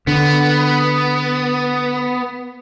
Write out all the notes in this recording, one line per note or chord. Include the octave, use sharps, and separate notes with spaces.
D3 B3